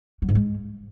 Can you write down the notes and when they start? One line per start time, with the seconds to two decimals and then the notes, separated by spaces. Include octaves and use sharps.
0.22 F#3
0.29 G#2
0.35 G#3